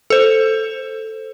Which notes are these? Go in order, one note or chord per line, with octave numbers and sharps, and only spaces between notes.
A4 C5